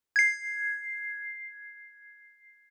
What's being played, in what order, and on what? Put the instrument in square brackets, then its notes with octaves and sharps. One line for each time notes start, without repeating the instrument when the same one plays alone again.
[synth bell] G#6 C7